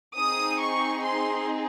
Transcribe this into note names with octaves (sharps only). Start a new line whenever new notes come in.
C4 D#4 G#4 D#6
C#6
C6